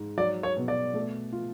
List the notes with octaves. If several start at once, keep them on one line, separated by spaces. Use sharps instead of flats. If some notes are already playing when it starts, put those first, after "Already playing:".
Already playing: G#2
F#3 D5
C#5
B2
D5
A3
F4